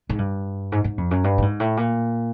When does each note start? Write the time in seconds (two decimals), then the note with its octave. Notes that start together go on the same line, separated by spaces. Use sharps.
0.09 G#2
0.19 G2
0.72 G#2
0.84 G#2
0.98 F2
1.11 F#2
1.24 G2
1.38 A2
1.42 G#2
1.60 A2
1.77 A#2